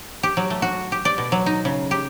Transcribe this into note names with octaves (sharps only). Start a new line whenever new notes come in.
G4
F#3
A3
F#4
G4
D5
B2
F#3
D#4
C#3
G4